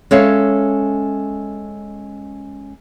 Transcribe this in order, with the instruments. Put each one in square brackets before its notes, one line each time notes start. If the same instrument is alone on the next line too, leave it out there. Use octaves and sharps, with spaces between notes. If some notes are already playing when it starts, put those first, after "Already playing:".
[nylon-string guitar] G#3 C#4 A4 C#5 E5 F5